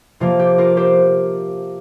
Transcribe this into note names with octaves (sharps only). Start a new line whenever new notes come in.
C3 F3 A#3 F4
G4
F4 A#4
G4 C5